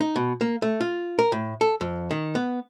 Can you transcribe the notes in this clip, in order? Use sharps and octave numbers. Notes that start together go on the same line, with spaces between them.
D#4
B2
A#3
A3
F4
A#4
A2
A4
F2
D#3
B3